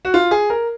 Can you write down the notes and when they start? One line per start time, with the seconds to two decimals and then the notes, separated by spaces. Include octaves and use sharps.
0.05 F#4
0.14 F4
0.31 G#4
0.50 A#4